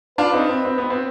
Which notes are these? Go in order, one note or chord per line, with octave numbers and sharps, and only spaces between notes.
D4 F4 B4
C4 D#4
C4
C4
B3 B4
C4